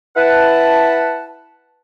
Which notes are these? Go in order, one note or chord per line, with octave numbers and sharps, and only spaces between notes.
E4 B4 F#5 A5